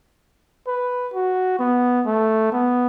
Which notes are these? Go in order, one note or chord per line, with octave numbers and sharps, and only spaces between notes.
B4
F#4
B3
A3
B3